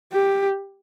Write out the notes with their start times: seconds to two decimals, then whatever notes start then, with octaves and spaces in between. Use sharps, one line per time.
0.13 G4